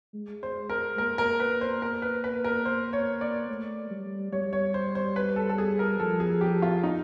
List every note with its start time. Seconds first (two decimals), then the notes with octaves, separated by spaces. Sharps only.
0.14 G#3
0.43 C5
0.70 A#4
0.98 A#3 A#4
1.18 A#4
1.40 B4
1.61 C5
1.82 A#4
2.02 B4
2.24 B4
2.44 A#4
2.65 C5
2.93 C#5
3.21 D5
3.48 A3
3.90 G3
4.32 G3 C#5
4.53 C#5
4.74 C5
4.95 C5
5.16 B4
5.36 A4
5.49 A4
5.58 G#4
5.79 A#4
6.00 F3 A4
6.20 G#4
6.41 G4
6.62 F4
6.83 D#4